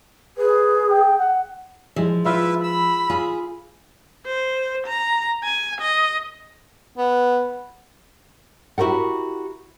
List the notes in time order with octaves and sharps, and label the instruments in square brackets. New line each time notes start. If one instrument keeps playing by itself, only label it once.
[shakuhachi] G#4 [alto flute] B4
[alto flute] G5
F#5
[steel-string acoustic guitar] F3 [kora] G#3 E4 E5
[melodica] E4 B4 E5 [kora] F4 F5
[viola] B5 [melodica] E6
[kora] F4 [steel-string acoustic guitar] G#4
[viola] C5
A#5
G#5
D#5
[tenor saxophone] B3
[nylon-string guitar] E4 F#4 G4 A#4 F#5